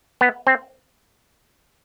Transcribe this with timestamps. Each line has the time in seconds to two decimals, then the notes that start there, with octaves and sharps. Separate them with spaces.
0.21 B3
0.47 C4